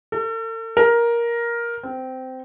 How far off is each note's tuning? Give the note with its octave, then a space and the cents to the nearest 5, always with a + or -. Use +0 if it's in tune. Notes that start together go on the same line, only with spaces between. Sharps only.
A4 +45
A#4 +10
C4 -15